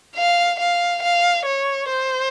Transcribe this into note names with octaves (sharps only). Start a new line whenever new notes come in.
F5
F5
F5
C#5
C5